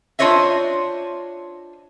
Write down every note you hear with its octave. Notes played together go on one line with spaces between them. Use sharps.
D4 F4 C5 C#5 D#5 E5